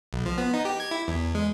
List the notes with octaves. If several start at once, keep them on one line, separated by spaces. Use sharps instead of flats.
B1
F3
B3
D#4
G4
G#6
E4
E2
G#3